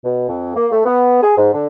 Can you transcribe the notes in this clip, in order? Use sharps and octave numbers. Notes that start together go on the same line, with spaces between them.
B2
F2
A#3
A3
B3
G#4
G#2
D3